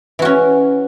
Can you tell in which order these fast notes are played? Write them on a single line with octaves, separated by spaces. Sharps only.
E3 F#4 C#4